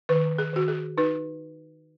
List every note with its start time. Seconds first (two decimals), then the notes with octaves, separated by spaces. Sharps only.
0.09 D#3 B4
0.38 G#4
0.53 D#3 F#4
0.68 G#4
0.98 D#4 B4